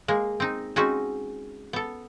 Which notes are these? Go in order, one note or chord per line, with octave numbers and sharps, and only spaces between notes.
G#3 A#3
C4 D#4
G#3 C4 C#4 D#4 F#4
B3 A4